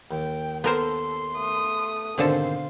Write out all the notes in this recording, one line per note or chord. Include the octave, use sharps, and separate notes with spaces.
D#2 G5
B3 A4 A#4 C5 C6
A3 D#6
G#2 B2 D3 D#3 C4 A4 C5 F5